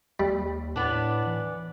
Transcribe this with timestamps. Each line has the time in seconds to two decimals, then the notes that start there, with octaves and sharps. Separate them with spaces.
0.20 D#2 G3
0.76 A2 B3 D4
1.26 E3